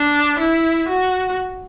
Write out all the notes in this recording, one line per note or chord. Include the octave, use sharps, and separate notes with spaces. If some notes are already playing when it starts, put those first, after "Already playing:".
Already playing: D4
E4
F#4